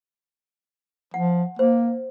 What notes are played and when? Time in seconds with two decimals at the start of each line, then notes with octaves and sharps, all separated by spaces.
1.14 F3 F#5
1.59 A#3 C5